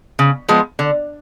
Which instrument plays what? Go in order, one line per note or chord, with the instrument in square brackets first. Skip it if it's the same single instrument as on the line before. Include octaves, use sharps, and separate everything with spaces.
[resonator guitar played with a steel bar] C#3
F3 G#3 B3
D3